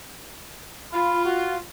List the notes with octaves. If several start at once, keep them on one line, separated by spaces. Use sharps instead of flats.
F4 B5
F#4